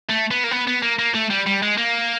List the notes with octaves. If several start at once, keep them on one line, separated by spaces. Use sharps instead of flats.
A3
B3
A#3
B3
B3
A#3
A#3
A3
G3
G3
G#3
A#3